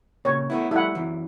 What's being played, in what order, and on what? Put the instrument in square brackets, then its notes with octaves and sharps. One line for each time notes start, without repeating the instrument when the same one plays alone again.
[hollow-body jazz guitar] A#2 C#3 [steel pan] C#5
[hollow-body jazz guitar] A3 B3 E4
[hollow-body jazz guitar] G3 A3 [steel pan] E4 F#5
[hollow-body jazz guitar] F#2 E3